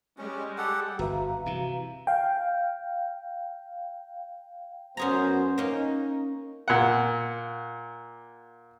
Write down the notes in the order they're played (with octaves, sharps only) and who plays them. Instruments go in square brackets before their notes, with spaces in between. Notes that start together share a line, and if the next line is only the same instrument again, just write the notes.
[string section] G3 G#3 [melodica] C#4
[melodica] G4 A4 F#5
[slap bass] G1 [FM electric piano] F#4 B4 E5 [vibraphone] F5 A#5
[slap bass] C3 E3
[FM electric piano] F5 G5
[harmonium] F#2 B3 C5 [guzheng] C#4 G#4 A#5
[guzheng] A#3 C#4 [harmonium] D#4
[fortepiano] A#2 F#5